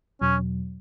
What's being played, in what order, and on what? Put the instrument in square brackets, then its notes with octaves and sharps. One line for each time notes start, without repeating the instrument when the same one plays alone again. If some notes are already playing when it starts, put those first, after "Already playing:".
[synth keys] E2 B2 F#3 [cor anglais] C#4